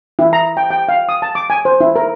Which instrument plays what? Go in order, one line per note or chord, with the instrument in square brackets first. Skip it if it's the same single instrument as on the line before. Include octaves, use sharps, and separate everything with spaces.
[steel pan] E4
A#5
G5
G5
F5
D#6
A5
D6
G#5
C5
E4
A#4